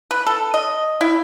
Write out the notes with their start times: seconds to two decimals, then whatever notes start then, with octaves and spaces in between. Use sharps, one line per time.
0.11 B4
0.26 A4
0.54 D#5
1.01 E4